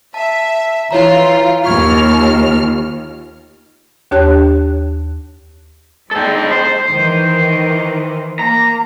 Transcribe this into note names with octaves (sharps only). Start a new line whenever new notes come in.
E5 A5
E3 E4 F4 C#5 A#5
D#2 F4 C#6 F6 G#6
D#2 D4 G4 C#5 A5 F#6
G#3 D#4 A4 G5
C5
D#3 E3
A#3 A#5